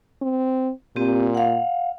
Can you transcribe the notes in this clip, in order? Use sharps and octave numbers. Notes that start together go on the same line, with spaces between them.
C4
A#2 C4 G4
F5 F#5